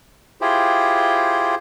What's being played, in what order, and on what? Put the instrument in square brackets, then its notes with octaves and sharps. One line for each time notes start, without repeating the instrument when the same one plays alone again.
[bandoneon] E4 F4 G4 G#4 C5 G5